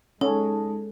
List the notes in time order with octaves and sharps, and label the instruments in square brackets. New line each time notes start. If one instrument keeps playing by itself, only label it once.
[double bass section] G#3 [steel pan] C#4 [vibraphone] D#4 A5 [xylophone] A4